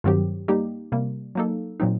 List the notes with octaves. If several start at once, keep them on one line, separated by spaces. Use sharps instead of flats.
G2 D#3 F#3 C4 G4
G3 A#3 D#4 G4
C3 G3 A#3
F#3 A#3 D#4 A4
A#2 F#3 C4 D#4